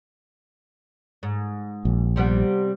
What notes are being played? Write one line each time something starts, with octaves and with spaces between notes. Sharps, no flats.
G#2
A#1
C3 G3 B3